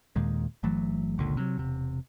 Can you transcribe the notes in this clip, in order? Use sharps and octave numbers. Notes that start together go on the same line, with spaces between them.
D#2 A#2 D#3 G#3
G1 E3 F#3 A3
G1 C#2 A#2 D3
C3 F#3
E1 C3